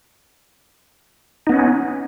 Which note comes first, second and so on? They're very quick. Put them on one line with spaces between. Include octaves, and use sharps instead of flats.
D#4 B3 C#4